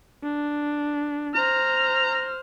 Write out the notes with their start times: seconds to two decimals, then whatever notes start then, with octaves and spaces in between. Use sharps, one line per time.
0.23 D4
1.35 C5 A#5 F6